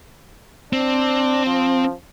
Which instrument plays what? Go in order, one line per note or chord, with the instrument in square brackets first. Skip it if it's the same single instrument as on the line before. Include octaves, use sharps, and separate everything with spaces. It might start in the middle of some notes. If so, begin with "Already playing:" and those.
[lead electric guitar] C4 [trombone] D4
[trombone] F3